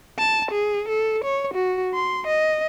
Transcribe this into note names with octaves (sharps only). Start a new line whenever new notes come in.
A5
G#4
A4
C#5
F#4
C6
D#5